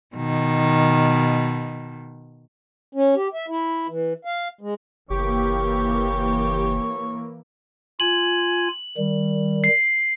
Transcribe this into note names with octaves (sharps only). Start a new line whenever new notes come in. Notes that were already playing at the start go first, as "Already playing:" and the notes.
B2 D#3
C#4
G4
E5
E4
E3
F5
G#3
F#1 E3 A#3 G4 C#5
F4 G#5 G#6 F#7
D#3 G3
C7